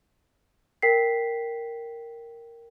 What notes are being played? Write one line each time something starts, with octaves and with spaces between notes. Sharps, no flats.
A#4 G5 B6 C7